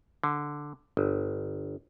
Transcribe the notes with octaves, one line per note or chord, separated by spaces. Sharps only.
D3
G1